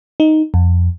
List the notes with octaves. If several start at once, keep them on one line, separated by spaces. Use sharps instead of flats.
D#4
F2